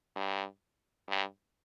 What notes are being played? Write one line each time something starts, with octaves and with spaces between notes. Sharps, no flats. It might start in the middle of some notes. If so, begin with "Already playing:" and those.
G2
G2